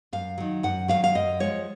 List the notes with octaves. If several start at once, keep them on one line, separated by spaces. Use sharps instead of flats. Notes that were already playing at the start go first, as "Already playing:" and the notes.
F#2 F5
D#3 F#3
F#2 F#5
D#3 F#3 F5
F5
F#2 D#5
F3 G#3 C#5